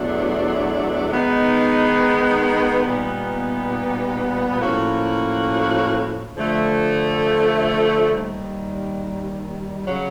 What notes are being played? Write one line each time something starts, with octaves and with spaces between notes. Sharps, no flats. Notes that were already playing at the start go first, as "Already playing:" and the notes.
Already playing: E2 B2 F#3 A3 D4
D#3 G#3 B3 D#4
A#2 G3 B3 D#4 G4
A2 F3 A#3 C#4 F#4
D3 F3 A3
D#2 D#3 G3
C#3 F#3